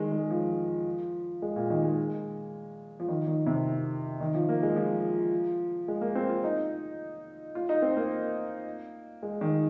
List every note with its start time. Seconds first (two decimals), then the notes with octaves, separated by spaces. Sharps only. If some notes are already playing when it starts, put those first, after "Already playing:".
Already playing: D#3 G#3
0.12 G#3
0.30 F3
1.42 G#3
1.56 A#2
1.70 D#3
1.83 G#3
3.00 F3
3.08 D#3
3.27 D#3
3.46 C3
4.21 D#3
4.34 F3
4.49 A#3
4.63 G#3
4.76 F3
5.88 G#3
6.01 A#3
6.15 C4
6.29 F4
6.44 D#4
7.55 F4
7.69 D#4
7.82 C4
7.97 A#3
9.23 G#3
9.41 D#3